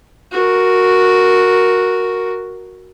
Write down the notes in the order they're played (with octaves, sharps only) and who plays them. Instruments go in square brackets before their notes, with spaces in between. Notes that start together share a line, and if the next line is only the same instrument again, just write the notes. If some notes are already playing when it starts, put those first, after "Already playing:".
[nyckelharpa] F#4 A#4